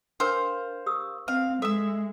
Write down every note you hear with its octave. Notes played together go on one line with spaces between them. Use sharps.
D4 A#4 C5 F5 G5 G6
G4 D#6 E6
C4 F5
G#3 A4 E5 E6